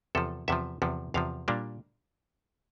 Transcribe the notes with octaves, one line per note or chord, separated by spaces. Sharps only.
E2 C3 F3 A4
E2 C3 F3 E5
E2 C3 F3
E2 C3 F3 F5
A#2 G3 A#3 D4